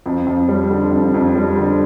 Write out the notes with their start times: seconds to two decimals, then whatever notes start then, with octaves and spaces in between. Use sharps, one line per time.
0.06 F2
0.26 F2
0.48 G3
0.70 D3
0.91 F2
1.14 F2
1.35 G3
1.57 D3